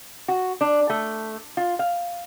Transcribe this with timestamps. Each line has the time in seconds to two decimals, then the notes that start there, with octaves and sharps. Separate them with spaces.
0.28 F#4
0.61 D4
0.90 A3
1.57 F4
1.79 F5